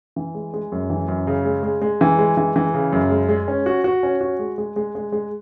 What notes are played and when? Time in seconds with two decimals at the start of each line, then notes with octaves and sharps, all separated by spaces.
0.16 E3
0.35 G#3
0.54 G#3
0.72 F#2
0.90 E3
1.08 F#2
1.27 C#3
1.45 G#3
1.63 G#3
1.82 G#3
2.01 E3
2.19 G#3
2.37 E3
2.56 E3
2.74 C#3
2.93 F#2
3.10 G#3
3.29 G#3
3.48 C#4
3.66 F#4
3.84 F#4
4.03 C#4
4.21 F#4
4.39 G#3
4.58 G#3
4.76 G#3
4.95 G#3
5.12 G#3